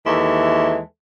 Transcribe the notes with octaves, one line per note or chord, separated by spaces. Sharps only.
D#2 E3 G#3 A4 E5